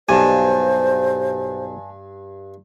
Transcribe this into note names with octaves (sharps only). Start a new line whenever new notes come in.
B1 G2 C5 D5 G#5 A5